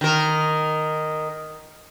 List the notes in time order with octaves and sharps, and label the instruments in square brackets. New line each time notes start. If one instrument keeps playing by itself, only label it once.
[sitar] D#3 A#4